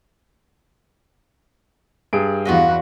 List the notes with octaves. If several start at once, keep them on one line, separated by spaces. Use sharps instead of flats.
G2 G#4 D7
E2 F4 F#4 B4 D#5